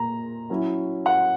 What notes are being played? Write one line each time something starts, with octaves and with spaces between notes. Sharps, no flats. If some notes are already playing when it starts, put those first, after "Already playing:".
Already playing: A#2 A#3 A#5
F#3 C#4 E4
F#5